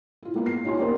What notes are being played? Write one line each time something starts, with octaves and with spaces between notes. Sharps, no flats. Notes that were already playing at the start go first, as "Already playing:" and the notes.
E4 F4
G#3 A#3 B3 F4
C7
C#4 D#4 F4 G4 G#5 C6
A#3 B3 G4 A#4 C5 D5